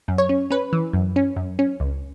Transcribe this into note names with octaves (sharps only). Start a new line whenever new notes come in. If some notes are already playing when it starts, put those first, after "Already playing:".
F#2
C#5
C#4
C#4 B4
E3
F#2
C#4
F#2
C#4
C#2